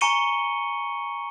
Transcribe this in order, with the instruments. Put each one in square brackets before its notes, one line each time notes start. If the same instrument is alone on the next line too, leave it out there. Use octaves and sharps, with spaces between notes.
[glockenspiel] G#5 A#5 C#6 C#7 D#7 G7